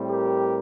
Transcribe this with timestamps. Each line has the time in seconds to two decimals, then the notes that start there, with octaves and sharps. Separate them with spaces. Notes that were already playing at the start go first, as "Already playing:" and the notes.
Already playing: A2 G3 C4
0.10 G4 A#4